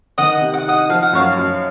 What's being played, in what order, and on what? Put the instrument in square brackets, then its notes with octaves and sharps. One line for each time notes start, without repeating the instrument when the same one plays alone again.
[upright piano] D#3 [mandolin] D#5 F#5
[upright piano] C3
[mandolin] F#5
[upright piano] D#4 [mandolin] D#5 F#5
[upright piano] F3 [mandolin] F5
[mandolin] F#5
[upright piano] F#2 [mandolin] C#5 F5
[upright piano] F#2